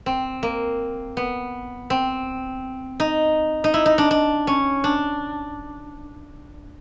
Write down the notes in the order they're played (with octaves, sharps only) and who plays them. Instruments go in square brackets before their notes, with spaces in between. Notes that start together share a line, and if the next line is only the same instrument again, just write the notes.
[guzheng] C4
A#3
B3
C4
D#4
D#4
E4
D#4
D4
D4
C#4
D4